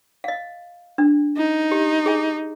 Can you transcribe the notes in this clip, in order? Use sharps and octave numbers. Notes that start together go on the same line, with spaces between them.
D#5 F5
D4
D#4
G4
G#4 G#5